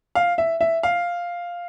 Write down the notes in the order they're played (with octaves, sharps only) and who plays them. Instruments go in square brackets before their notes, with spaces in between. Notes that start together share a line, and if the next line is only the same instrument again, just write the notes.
[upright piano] F5
E5
E5
F5